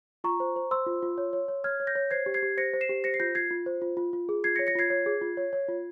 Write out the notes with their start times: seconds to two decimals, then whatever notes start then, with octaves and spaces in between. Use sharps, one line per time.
0.24 F4 A#5 C#6
0.40 C5
0.56 C5
0.71 C5 C6 E6
0.87 F4
1.02 F4
1.18 C#5
1.33 C#5
1.48 C#5
1.64 C#5 F6 G#6
1.80 C#5
1.87 G6 A#6
1.96 C#5
2.11 C5 G#6 C7
2.26 G4
2.34 G#6 C7
2.43 G4
2.57 C5 A#6 C#7
2.73 C5
2.81 C7 E7
2.89 G4
3.04 C5 A#6 C#7
3.14 C7
3.20 F4 G6 A#6
3.35 F4 G#6 C7
3.51 F4
3.66 C5
3.82 F4
3.97 F4
4.13 F4
4.29 G#4
4.44 F4 G#6 C7
4.56 A#6 C#7
4.59 C#5
4.67 A#6 C#7
4.75 F4 G#6 C7
4.90 C#5
5.06 G#4
5.21 F4
5.37 C#5
5.53 C#5
5.68 F4